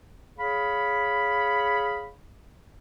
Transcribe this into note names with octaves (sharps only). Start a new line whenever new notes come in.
G#4 C#5 F5 B5